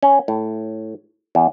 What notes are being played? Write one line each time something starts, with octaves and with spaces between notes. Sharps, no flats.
C#4
A2
E2